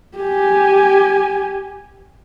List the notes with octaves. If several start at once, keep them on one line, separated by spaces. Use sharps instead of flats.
G4 G#5